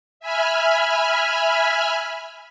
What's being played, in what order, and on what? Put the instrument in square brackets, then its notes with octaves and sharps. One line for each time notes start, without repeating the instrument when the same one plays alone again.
[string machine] E5 G#5 B5 F6